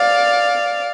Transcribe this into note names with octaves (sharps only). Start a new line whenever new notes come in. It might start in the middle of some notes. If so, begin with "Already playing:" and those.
Already playing: D5 F5